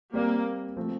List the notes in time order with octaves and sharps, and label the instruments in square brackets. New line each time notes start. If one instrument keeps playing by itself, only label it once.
[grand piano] G3 C4 G4 D5 [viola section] A#3
[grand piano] F3 A3 C4